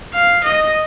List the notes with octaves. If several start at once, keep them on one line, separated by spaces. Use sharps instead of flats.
F5
D#5